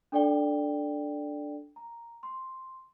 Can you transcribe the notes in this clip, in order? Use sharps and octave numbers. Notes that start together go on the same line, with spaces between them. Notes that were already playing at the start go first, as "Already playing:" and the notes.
D4 A4 D5 G5 G7
A#5
C6